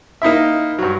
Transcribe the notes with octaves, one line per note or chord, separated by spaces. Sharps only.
A#3 D#4 E4 E5
G2 F#3